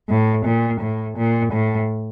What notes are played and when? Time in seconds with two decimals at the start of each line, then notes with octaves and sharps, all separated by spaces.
0.09 A2
0.45 A#2
0.81 A2
1.17 A#2
1.52 A2